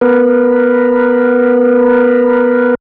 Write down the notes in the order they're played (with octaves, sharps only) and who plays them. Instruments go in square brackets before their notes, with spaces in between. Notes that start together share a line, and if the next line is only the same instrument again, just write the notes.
[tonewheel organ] B3 A#4 B4